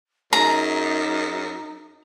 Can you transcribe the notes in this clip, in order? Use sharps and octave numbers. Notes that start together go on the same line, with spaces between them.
F#2 D#4 G#4 A#5